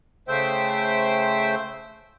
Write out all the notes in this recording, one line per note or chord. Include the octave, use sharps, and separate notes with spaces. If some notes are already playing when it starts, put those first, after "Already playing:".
C#3 A3 C5 E5 G5